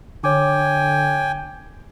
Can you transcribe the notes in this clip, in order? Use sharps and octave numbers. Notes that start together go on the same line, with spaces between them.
D3 C#5 G5 G#5 D6